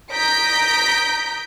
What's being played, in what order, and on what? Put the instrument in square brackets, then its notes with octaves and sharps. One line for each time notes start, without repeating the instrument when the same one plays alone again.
[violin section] A#5 D#6 G6 A#6 B6 D7